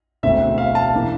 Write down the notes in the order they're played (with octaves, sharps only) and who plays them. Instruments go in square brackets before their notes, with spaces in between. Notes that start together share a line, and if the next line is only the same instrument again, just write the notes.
[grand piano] E1 D2 D3 A3 C4 E5
F5
A5
E3 A#3 D4